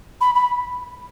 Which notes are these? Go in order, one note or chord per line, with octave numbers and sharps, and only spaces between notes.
B5
B5